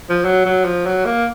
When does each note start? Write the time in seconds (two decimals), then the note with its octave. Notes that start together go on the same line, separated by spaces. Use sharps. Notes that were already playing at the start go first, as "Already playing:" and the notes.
0.09 F3
0.25 F#3
0.45 F#3
0.65 F3
0.86 F#3
1.05 A#3